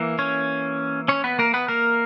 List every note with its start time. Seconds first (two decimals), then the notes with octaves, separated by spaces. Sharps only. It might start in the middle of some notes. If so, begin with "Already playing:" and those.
Already playing: E3 A#3
0.19 C#4 C#5
1.08 C#4 C#5
1.24 B3 B4
1.39 A#3 A#4
1.54 B3 B4
1.68 A#3 A#4